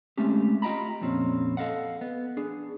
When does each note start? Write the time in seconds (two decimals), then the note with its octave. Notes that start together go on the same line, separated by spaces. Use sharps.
0.18 G#3 A3 C4 C#4 G4
0.62 F4 D#5 G5 A#5 B5
1.01 F2 A#2 C4 C#4
1.57 A4 D#5 F5 F#5
2.01 B3
2.37 D4 G#4